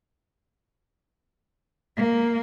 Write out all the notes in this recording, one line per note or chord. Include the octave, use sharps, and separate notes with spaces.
A#3